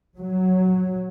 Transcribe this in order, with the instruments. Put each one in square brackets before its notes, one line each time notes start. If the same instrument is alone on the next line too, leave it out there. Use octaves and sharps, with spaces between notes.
[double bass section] F#3